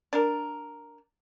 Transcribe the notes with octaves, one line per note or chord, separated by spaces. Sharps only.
D4 A#4